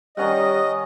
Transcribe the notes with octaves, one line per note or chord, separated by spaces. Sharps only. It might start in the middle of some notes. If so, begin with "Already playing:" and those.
D#3 G3 C#4 D#5 F#5